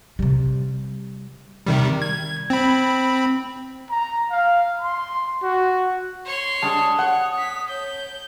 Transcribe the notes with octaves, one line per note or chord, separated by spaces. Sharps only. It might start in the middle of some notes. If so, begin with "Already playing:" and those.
C3 G3
C3 D#3 G3
G#6
C4 B5
A#5
F5
C6
F#4
C#5 C6
G3 G#3 D4 A5 D#6
C#5 F#5
B6
C#5 G6